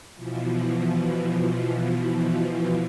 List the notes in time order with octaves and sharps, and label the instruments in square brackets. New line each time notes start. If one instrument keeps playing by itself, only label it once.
[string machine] B2 E3 F3